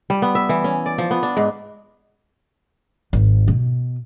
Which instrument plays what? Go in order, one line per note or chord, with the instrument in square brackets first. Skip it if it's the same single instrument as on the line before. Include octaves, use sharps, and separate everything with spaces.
[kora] G3
B3
E5
E3
C#4
D5
F3
B3
D4
G#2
[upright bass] G#1
B2